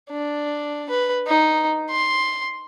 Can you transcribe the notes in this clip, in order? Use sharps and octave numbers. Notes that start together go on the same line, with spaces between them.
D4
B4
D#4
C6